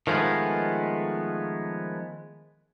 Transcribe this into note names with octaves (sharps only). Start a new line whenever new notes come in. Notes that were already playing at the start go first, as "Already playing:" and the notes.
D#3 F3 G#3 A3 B3